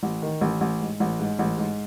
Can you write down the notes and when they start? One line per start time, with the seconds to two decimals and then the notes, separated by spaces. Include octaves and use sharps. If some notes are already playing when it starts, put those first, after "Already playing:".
0.03 A1
0.22 D#3
0.41 A1
0.61 A1
0.81 G#2
1.00 A1
1.20 G#2
1.39 A1
1.58 G#2